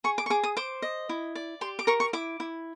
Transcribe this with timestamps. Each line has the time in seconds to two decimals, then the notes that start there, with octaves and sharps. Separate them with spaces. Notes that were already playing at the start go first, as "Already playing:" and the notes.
0.04 G#4 C#6
0.18 D6
0.26 C#6
0.30 G#4 D6
0.43 D#6
0.57 C5 D6
0.82 D#5
1.09 E4
1.35 D5
1.61 G4 C6
1.79 D6
1.87 A#4 C#6
2.00 C#6
2.13 E4 D6
2.40 E4